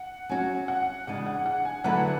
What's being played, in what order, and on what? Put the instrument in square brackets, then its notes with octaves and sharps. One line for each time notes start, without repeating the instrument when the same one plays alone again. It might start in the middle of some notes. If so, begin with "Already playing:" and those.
Already playing: [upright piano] F#5
[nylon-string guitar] F#3 C#4 F#4 [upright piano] G#5
[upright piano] F#5
[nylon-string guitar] C#3 E3 G#3 D4 [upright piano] F#5
[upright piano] F#5
F#5
G#5
[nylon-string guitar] D3 F#3 A3 E4 B4 [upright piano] F#5